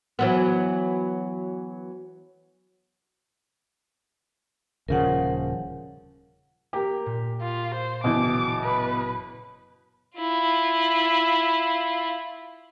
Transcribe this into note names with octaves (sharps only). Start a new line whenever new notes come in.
E3 F#3 B3
D#1 C#3 F3 A#4 F#5
A#3 G4 A#4
A#2
F4
C5
F#1 B2 E3 F4 G5 D6
B4
E4 F4